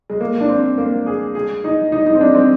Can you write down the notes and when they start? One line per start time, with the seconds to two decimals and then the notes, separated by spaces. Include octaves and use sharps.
0.10 G#3
0.21 A#3
0.41 D4
0.49 C4
0.78 A#3
1.07 G#4
1.35 G#4
1.64 D#4
1.92 D#4
2.06 D#4
2.15 C4
2.21 D4
2.35 C4